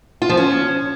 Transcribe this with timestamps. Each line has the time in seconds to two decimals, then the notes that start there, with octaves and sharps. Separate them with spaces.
0.22 F4
0.29 F3
0.37 C#4